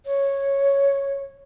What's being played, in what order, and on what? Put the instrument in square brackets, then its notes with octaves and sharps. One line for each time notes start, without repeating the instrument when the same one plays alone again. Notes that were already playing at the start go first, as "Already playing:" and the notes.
[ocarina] C#5